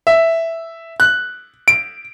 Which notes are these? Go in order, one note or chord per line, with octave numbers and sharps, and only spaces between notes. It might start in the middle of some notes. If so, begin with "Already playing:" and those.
E5
F#6
D7